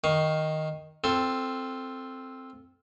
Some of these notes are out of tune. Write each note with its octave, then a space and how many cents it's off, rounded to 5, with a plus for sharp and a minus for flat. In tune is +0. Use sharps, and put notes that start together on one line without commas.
D#3 +0 F5 +10 C#6 -5
C4 +0 F4 +0 A4 +5